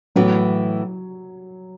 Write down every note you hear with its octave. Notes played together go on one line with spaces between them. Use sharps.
A2 E3 F#3 B3